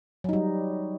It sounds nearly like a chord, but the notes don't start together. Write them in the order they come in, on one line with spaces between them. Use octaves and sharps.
F#3 D#4 G3